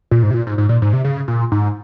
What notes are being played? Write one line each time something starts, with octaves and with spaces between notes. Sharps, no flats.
A#2
G#2
C3
A#2
G#2
G#2
A#2
G#2
C3
C#3
A#2
G#2